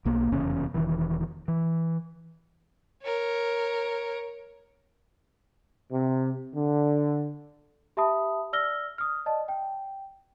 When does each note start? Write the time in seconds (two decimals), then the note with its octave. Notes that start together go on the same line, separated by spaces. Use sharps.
0.05 B1 A#3
0.32 F1 E2 C#3 C#4
0.74 E1 D#3 E3
1.48 E3
3.03 A#4 C#5
5.92 C3
6.55 D3
7.97 G4 E5 A5 B5 D#6
8.53 D5 E6 F6 A#6 G7
8.98 D#6 F6
9.26 D5 D#5 A5
9.48 G5